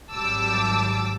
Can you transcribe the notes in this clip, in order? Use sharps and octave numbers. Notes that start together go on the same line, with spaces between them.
G#1 F#3 G3 A5 D6 E6